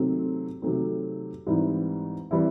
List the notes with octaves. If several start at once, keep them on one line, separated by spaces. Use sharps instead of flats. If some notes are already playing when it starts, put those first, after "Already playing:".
Already playing: C3 D#3 F#3 A3 C4
C3 D#3 F#3 A3 C4
G#2 E3 G3 C4 E4
E3 G3 C4 E4